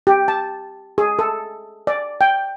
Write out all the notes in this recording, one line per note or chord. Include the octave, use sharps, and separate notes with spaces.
G4
A5
G#4
A4
D5
G5